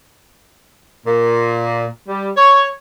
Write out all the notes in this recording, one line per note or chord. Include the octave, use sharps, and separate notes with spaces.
A#2
G3
C#5